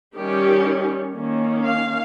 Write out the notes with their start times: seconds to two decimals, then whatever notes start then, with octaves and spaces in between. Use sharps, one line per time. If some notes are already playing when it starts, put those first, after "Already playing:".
0.15 D#3 G3 C#4 G4
1.15 D#3 A#3 C#4
1.64 F5